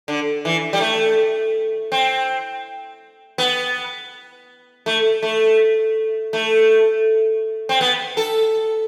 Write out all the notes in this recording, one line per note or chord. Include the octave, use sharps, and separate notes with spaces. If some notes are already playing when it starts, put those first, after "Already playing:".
D3
E3
G3
A3
C4
B3
A3
A3
A3
C4
B3
A4